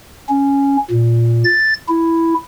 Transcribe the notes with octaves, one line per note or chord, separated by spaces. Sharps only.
C#4
A#2
A6
E4